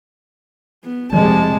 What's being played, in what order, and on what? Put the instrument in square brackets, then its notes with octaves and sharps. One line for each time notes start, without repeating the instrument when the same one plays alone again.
[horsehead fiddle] B3
[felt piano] F1 [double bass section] C3 G#3 [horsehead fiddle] A5